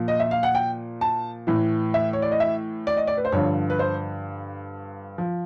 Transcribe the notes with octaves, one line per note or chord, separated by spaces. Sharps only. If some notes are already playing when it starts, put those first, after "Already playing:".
Already playing: A#2 F3
D#5
E5
F5
F#5
G5
A5
A2 E3
E5
C#5
D5
D#5
E5
D5
D#5
D5
B4
C5
G2 D3 F3 C#5
B4
C5
F3